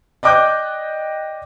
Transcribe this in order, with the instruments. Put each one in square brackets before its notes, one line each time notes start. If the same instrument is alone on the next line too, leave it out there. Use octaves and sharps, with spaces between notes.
[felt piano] D5 D#5 G5 D6 F#6 G6